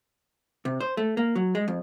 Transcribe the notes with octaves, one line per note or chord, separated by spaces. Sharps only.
C3
C5
A3
A#3
F#3
G#3
F2